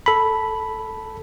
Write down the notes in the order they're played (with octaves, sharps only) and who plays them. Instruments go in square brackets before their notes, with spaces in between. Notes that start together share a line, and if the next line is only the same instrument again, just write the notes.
[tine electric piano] A4 B5